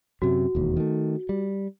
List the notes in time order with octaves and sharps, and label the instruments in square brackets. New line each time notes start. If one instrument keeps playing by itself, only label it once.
[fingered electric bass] F#2 C3 [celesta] F#4
[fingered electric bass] E1 D#2
D#3 A3
G3